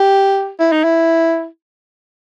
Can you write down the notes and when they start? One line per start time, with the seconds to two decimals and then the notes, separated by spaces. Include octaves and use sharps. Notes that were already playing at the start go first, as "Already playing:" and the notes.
Already playing: G4
0.59 E4
0.72 D#4
0.84 E4